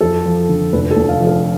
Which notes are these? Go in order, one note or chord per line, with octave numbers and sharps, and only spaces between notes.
F2 A4
F3
D3
F1 B4
A4
F1
F5
F2
A4